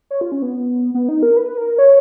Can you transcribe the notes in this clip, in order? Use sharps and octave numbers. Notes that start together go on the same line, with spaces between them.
C#5
F4
C#4
B3
B3
D#4
A#4
B4
A#4
C#5